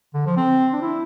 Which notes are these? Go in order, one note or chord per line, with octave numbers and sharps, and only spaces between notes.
D3
F3
C4
D4
E4